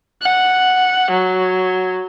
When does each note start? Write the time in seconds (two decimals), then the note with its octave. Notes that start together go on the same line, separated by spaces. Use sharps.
0.22 F#5
1.11 F#3